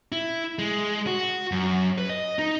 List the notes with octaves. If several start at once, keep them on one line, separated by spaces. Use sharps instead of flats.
E4
G#3
F#4
F#2
B4
D#5
D#4